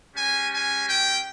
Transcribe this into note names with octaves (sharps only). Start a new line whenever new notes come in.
G#3 C#4 G4 G#5
G#5
G5